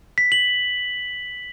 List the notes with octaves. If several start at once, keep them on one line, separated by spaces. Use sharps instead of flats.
B6
F#7